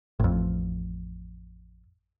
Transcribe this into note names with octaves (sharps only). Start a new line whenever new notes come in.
A1 F2